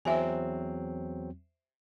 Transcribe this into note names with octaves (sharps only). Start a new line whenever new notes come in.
E2 F#3 C4 C5 E5 G#5